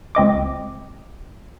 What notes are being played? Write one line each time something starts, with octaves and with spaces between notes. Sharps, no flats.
C#2 C4 D#5 D6